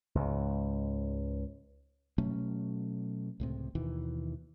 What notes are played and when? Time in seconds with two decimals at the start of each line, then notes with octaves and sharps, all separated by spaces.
0.15 C#2 G#2
2.18 B2 F#3 A3 C#4
3.40 C#2 A2 C3
3.75 D#2 B2 D#3 E3